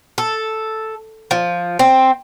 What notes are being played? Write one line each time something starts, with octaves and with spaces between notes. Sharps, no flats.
A4
F3
C4